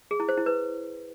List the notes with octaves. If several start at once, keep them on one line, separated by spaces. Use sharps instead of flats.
G#4
E4
C5
E4
B4